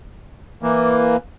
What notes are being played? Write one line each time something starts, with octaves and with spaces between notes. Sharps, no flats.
E3 A#3